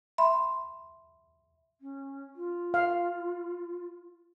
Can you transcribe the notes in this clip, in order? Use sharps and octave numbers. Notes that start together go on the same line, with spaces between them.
E5 B5 C6
C#4
F4
F5